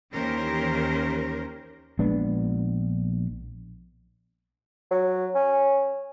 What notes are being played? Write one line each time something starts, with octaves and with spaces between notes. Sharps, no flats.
D#2 E3 C#4 G4 A#4 C5
A#1 G#3 B3 D4
F#3
C#4